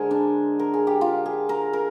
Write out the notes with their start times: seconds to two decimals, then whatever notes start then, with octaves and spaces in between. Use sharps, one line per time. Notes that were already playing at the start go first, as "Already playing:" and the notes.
Already playing: D3 G#3 G#4 A#4 C5
0.11 D4
0.59 A#4
0.74 G#4
0.87 G4
1.01 F4
1.26 G#4
1.49 A#4
1.73 A#4